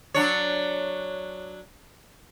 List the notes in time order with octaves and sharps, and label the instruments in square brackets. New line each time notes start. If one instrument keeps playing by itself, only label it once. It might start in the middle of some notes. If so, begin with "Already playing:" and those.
[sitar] F#3 D4 C#5